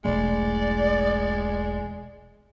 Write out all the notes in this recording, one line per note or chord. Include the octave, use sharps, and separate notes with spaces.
E1 B1 G#3 A3 D5